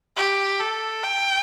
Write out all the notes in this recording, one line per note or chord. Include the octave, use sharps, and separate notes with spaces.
G4
A4
G5